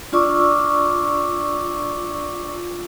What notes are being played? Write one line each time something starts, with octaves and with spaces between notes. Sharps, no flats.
D4 F4 D5 C#6 D6 E6